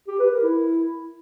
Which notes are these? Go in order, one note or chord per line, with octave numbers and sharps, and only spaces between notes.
G4
B4
A#4
E4